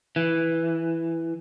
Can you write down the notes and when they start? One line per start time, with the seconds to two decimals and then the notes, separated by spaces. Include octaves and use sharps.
0.16 E3